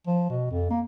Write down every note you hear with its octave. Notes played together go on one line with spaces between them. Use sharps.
F3
B2
F2
A#3